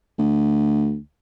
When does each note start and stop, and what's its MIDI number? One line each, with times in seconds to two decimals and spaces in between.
0.18 0.96 38